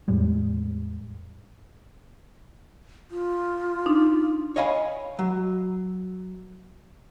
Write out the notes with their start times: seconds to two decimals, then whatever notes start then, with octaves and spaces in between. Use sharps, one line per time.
0.08 E2 A2 G3 G#3
3.11 F4
3.86 D4 D#4
4.56 C#5 D#5 F5 G#5 B5
5.19 F#3